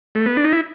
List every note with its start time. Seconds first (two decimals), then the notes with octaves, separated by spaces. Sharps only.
0.15 A3
0.26 B3
0.37 D4
0.44 D#4
0.52 E4